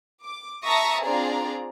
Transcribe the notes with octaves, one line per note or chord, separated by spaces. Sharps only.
D6
E5 A5 A#5 C#6 D#6 A#6
C4 D4 F4 G#4 D5 A#5